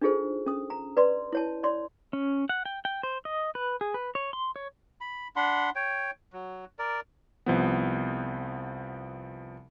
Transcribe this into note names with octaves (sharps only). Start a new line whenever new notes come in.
D4 D#4 F4 G#4 A4 C5
C#4 D#6
A#5
B4 D5 C6
E4 C#5 A5
C#5 D5 C6
C#4
F#5
G5
G5
C5
D#5
B4
G#4
B4
C#5
C6
C#5
B5
D4 F#5 B5 C6
C#5 G5
F#3
A#4 D5
C2 F3 B3